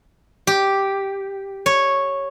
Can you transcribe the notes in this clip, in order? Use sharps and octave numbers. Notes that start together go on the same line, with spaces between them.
G4
C#5